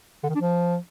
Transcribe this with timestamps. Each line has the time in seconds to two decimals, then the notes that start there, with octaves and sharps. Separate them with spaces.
0.23 D3
0.29 D#3
0.35 D4
0.41 F3